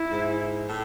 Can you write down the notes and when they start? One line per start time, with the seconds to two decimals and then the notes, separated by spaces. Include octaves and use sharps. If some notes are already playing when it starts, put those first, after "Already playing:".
Already playing: E4
0.11 G#2
0.69 A2